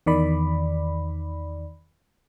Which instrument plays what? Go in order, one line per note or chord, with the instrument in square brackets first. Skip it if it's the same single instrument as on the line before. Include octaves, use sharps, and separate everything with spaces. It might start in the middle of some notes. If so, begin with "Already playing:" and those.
[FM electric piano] E2 D#3 D5 B5